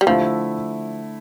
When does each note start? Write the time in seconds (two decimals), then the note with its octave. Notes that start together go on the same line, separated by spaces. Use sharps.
0.01 G3
0.07 D3 F3 A3 E4